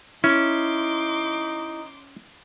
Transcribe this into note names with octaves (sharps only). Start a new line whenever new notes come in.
C#4 D#4 E4 C6 D6